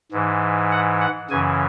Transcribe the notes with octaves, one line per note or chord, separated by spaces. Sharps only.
G#2 E3
F#5
F#5
F#2 C#3 E3 G#5